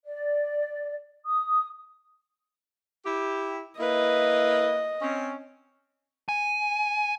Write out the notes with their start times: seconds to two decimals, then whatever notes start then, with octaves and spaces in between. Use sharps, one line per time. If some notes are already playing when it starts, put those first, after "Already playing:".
0.05 D5
1.25 D#6
3.06 E4 G4
3.80 A#3 E4 B4 D#5
5.02 C4 C#4
6.29 G#5